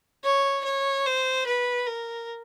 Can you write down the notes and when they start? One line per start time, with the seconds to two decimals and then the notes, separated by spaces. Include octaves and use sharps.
0.24 C#5
0.65 C#5
1.06 C5
1.46 B4
1.87 A#4